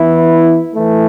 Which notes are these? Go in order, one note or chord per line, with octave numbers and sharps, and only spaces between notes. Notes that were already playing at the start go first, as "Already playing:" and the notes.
Already playing: E3 B3 E4
E3 A3